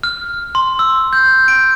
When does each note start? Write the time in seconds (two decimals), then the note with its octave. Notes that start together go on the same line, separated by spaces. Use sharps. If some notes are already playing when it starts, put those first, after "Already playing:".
0.03 F6
0.55 C6
0.79 E6
1.13 G6
1.48 D7